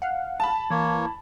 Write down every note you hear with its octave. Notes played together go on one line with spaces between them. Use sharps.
F5 F#5
A5 B5
E3 A#3 C#5